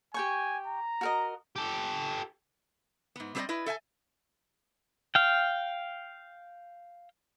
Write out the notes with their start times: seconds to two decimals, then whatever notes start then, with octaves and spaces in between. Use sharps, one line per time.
0.14 G4 G5 G#5 C#6
0.67 A#5
1.01 F#4 A#4 D#5
1.56 G4 A4
3.16 G#2 B3
3.35 G3 C4 A4 B4 D5 D#5
3.49 E4 B4 D#5
3.66 A4 E5 G5 G#5
5.15 F5 G5